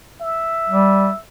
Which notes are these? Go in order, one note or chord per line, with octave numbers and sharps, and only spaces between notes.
E5
G3